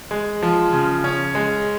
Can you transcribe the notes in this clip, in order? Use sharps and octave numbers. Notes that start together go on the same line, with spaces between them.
G#3
F3
C#3
C#4
G#3